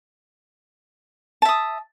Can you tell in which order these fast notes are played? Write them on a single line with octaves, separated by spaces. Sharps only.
A5 E5 D#6